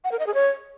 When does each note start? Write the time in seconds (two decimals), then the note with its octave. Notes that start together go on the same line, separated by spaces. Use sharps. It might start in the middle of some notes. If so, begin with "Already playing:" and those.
0.04 F#5
0.12 A#4
0.19 D#5
0.27 G#4
0.34 C#5